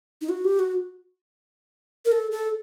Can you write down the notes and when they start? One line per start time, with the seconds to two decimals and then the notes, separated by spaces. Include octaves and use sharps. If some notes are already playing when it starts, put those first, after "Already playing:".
0.22 D#4
0.29 F#4
0.45 G4
0.59 F#4
2.05 A#4
2.12 A4
2.31 A4